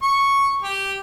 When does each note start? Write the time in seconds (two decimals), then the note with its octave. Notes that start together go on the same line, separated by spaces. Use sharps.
0.02 C#6
0.62 G4